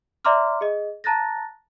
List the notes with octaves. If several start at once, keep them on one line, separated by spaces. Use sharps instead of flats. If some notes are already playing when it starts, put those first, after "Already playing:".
D5 E5 A#5 C6 D6 F6
G#4 D#5
A5 A#5 F#6 A6 A#6